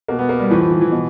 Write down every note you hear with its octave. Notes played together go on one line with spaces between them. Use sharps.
B2 A#3
B3
A#3
G3
A2 E3 F3
F3
E3
E3
B2